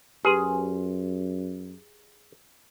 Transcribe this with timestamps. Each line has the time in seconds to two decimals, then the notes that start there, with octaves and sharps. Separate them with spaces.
0.25 F#2 G4 G#4 B4 C6